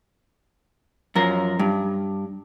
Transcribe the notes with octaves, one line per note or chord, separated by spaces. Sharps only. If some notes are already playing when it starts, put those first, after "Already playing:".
F#2 F3 A#4
G2